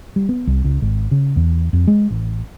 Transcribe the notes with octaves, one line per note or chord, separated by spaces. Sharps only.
G3
B3
C2
C#2
G#1
C#3
E2
F2
G#3
A1